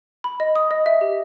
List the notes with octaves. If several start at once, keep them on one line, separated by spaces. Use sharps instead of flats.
B5
D#5
D#6
D#5
E5
G4